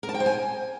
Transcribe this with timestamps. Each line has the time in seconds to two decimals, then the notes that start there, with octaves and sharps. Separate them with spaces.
0.03 A#4
0.09 A5
0.14 G5
0.20 C5
0.26 G#5